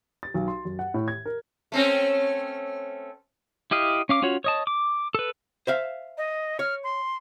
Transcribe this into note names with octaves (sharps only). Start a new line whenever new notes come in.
A6
B1
C6
F#2
F#5
A2
G#6
A#4
A3 C4 C#4
E4 G4 D#5 F5
C#4 F5 D6
C#4 F4 F#4 C#5
C#5 D#5 A5
D6
A4 B4
C5 E5 F5
D#5
C#5 F6
C6